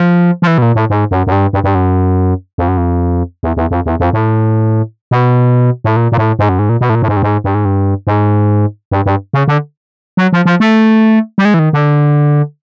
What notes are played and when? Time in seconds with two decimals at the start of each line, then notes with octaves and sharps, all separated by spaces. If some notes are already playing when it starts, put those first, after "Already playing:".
Already playing: F3
0.42 F3
0.47 E3
0.58 B2
0.62 A#2
0.75 A2
0.90 G#2
1.11 F#2
1.27 F#2
1.32 G2
1.53 G2
1.64 G2
1.75 F#2
2.58 F2
2.68 F#2
2.77 F2
3.43 E2
3.57 E2
3.71 F2
3.86 E2
4.00 F2
4.13 A2
5.11 B2
5.84 A2
5.96 A#2
6.12 A#2
6.18 A2
6.39 G#2
6.49 F#2
6.59 G#2
6.69 A#2
6.81 B2
6.90 A2
6.95 A#2
7.02 A2
7.08 G#2
7.17 G2
7.23 G#2
7.44 G2
7.55 G#2
7.65 G2
8.07 G#2
8.91 G2
9.06 G2
9.34 C#3
9.48 D3
10.17 F#3
10.33 F3
10.45 F3
10.60 A3
11.38 G3
11.45 G#3
11.54 E3
11.59 D#3
11.73 D3